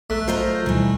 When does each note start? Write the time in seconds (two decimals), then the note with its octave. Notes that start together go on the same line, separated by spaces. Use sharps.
0.10 A#1 A3 F#6 B6
0.28 F#3 F4 A#4 C5 D#5 G6
0.66 D2 B2 D#3 E3 G3